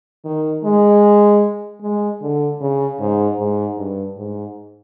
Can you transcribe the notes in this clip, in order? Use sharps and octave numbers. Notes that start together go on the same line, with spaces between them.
D#3
G#3
G#3
D3
C#3
G#2
G#2
G2
G#2